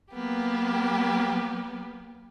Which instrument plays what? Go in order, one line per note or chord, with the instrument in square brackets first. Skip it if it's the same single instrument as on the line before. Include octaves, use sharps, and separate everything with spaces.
[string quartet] F#3 A#3 B3 G4